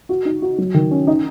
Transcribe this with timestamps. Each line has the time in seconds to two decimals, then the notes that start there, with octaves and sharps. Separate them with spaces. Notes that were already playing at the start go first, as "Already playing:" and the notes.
0.09 F#4
0.25 D#4
0.42 F#4
0.58 F#3
0.74 D#3
0.91 C#4
1.07 D#4